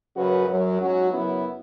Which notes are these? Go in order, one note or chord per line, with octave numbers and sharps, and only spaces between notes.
F#2 C#3 F#3 F#4 B4
F#2 F#3
G#2 F#3 C#4 F#4
F#2 C#3 F#3 B3 E4